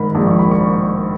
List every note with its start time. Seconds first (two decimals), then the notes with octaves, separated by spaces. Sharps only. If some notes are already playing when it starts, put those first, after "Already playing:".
Already playing: G#2 D#3 B5
0.15 A#1
0.27 C#6
0.39 B5
0.51 C#6